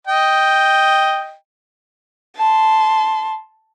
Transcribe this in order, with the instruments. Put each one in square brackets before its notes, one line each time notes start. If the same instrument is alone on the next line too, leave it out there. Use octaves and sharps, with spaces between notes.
[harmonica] D#5 G5
[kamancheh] A5 C6